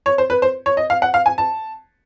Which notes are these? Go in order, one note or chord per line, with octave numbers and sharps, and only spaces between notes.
C#5
C5
B4
C5
C#5
D#5
F5
F#5
F5
G#5
A5